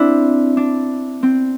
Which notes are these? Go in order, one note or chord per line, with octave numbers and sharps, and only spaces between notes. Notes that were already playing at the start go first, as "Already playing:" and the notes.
Already playing: C4 D4 E4
D4
C4